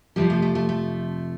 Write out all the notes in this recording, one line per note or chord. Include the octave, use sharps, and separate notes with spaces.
F2 C3 F3 G3
A3
A3
A3
A3